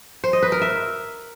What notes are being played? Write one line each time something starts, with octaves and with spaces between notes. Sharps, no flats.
C5
D#5
B4
A#4
E5